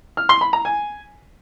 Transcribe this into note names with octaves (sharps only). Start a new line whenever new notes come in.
F6
C6
B5
A#5
G#5